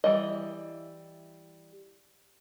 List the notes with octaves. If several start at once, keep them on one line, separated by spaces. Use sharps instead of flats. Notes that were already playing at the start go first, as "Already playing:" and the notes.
E3 G3 D#5